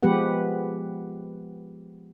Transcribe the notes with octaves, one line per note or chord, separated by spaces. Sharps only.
F3 G#3 B3 G4 B4 F#5